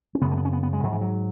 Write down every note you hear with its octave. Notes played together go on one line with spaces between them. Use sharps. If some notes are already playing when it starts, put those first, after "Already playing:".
C#4
F#2 C#3 B3
A3
B3
C#4
B3
B3
G#3
G#2 F#3
E3
F#3